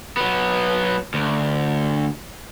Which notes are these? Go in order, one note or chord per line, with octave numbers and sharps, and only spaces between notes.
F#3 B3
D2